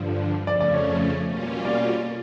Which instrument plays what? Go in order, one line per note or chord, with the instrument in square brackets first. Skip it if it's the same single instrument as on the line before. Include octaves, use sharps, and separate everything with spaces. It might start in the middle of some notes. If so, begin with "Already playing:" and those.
Already playing: [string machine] G2 D3 F3
[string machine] F2 C#3 F3 A3 C#4 [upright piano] D5
[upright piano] D5
C#5
[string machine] B2 G3 A#3 C#4 F4
[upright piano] D5